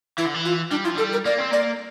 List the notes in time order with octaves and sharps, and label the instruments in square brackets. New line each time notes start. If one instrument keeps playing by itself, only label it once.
[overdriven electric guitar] E3 [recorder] E4
[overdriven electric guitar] D3
E3
[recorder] F4
[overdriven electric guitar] G3 [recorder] D4
[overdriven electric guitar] F3 [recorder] E4
[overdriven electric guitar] G3 [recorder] A4
[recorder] A#4
[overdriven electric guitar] A#3 [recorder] D5
[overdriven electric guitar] C4
[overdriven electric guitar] A#3 [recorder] D5